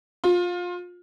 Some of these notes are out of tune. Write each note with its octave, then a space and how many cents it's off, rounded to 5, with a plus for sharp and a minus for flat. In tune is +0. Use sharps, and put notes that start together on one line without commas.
F4 +20